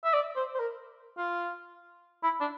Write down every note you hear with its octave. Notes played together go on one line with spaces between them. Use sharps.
E5
D5
C5
C5
A#4
F4
E4
D4